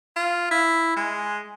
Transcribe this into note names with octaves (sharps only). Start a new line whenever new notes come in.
F4
E4
G#3